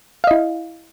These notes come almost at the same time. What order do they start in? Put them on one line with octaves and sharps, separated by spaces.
F5 D#5 E4